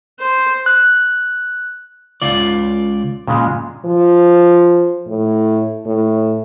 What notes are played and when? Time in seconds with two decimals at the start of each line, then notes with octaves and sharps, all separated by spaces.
0.19 C5
0.66 F#6
2.22 C#2 F4 D5
3.28 A#2 C#3 G#3
3.85 F3
5.08 A2
5.86 A2